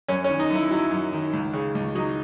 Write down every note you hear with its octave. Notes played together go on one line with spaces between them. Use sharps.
F#2 C#4
C#4
D#3
D#4
F#2 E4
F#3 E4
F#2
D#3
C#2
C#3
C#2
F#3 D#4